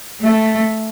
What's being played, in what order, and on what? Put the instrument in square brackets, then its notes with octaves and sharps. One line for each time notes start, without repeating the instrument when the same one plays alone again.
[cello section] A3